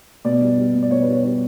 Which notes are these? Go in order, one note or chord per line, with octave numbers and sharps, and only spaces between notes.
B2 D5
G3
G3
B2
D5
B2 C#5
B4
G3
C#5
G3 C#5